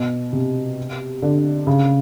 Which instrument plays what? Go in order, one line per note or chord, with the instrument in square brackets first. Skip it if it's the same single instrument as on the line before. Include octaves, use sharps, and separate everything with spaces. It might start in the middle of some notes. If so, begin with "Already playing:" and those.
Already playing: [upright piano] B2
C3
D3
C#3